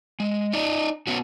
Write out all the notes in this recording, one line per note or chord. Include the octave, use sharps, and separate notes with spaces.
G#3
D#4 D5 D#5
B3 C#4 F#4